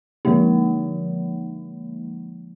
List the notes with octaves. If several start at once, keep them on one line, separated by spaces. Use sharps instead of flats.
D3 F3 G#3 A#3 D#4